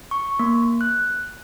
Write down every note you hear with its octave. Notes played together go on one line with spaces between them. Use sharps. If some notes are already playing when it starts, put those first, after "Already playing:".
C#6
A#3
F#6